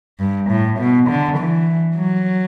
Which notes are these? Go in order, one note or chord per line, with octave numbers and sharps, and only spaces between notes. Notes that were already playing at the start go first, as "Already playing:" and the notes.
G2
A2
B2
D3
E3
F#3